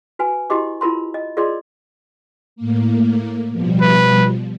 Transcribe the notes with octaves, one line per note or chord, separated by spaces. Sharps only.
F#4 B4 G#5
E4 F#4 G4 D#5 C6 D6
E4 F4 A#4 B5 C6
D#5
F4 G#4 A#4 D5 D#5 C6
A2 A#3
B2 F3 G3
B4